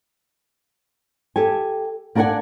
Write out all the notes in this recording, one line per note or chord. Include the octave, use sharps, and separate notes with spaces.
G4 A4 G#5
A#3 D4 A#4 C#5 F#5 G#5